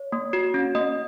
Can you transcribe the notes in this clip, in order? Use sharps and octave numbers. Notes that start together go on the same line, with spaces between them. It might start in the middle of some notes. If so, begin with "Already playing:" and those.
Already playing: C#5
A#3
F#4
C#4
A#3 D#5